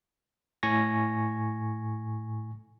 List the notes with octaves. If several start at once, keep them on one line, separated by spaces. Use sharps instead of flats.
A2 G#5 C#6 A#6